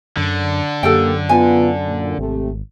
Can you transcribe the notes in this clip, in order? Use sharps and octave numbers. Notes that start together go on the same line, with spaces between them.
F#2 D3
F#2 A#3 G4 A4 G5
B3 F4 G#5
A#2
G#1 C3 A3